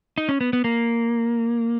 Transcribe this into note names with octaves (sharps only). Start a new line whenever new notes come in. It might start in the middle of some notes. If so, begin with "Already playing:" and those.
D#4
C#4
B3
B3
A#3